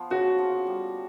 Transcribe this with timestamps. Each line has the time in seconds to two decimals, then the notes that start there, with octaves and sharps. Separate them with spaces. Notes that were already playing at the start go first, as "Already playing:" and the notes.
Already playing: F3 B3
0.10 C#3 F#4
0.38 F3
0.67 G3